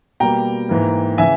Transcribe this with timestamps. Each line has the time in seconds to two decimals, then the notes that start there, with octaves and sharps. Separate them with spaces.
0.20 B2 G3 A#3 G5 A#5
0.69 G#2 E3 A#3
1.18 C#3 E3 E5 G#5